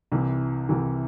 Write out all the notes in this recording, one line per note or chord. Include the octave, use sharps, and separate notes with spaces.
C2 C3 E3
C2 C3 E3